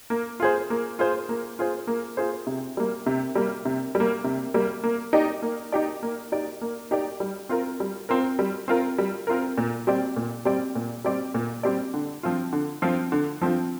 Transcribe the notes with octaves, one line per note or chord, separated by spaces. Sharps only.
A#3
F4 G#4 C5
A#3
F4 G#4 C5
A#3
F4 G#4 C5
A#3
F4 G#4 C5
C3
G3 A#3
C3
G3 A#3
C3
G3
A#3
C3
G3 A#3
A#3
D#4 G4 D5
A#3
D#4 G4 D5
A#3
D#4 G4 D5
A#3
D#4 G4 D5
G3
C4 F4 A#4
G3
C4 F4 A#4
G3
C4 F4 A#4
G3
C4 F4 A#4
A#2
G3 C4 G4 D5
A#2
G3 C4 G4 D5
A#2
G3 C4 G4 D5
A#2
G3 C4 G4 D5
D3
F3 C4 F4
D3
F3 C4 F4
D3
F3 C4 F4